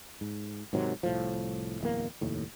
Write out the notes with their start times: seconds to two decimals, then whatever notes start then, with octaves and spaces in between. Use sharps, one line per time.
0.21 G#2
0.73 G#2 C3 D#3 F#3
1.03 C2 A2 F3
1.81 D1 E2 A#3
2.21 F1 D#2 A2